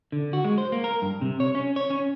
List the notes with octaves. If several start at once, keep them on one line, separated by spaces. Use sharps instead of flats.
D3
F#4
G#3
C5
A#3
A#4
G2
C3
C#5
C#4
C#5
C#4